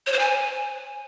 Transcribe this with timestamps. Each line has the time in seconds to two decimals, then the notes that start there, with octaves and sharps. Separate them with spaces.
0.07 C#5
0.13 C5
0.19 G#5